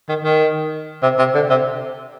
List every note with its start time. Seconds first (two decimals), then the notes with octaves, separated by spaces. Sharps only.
0.09 D#3
0.24 D#3
1.03 C3
1.19 C3
1.35 D3
1.50 C3